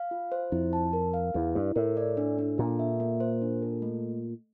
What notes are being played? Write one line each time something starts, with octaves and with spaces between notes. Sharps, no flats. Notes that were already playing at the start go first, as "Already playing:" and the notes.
Already playing: F5
F4
C5
F2 E4
A5
A#4
F5
E2 E4
G2 E4
A2 A#4
D5
D4
D4
A#2 A4
E5
A#3
C5
D4
A4
A3